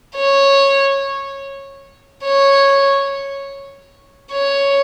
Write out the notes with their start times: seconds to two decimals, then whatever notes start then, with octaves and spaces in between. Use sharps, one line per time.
0.16 C#5
2.25 C#5
4.32 C#5